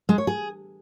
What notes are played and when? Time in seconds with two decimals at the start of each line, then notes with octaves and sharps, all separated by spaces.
0.09 G#3
0.18 C#5
0.27 G#4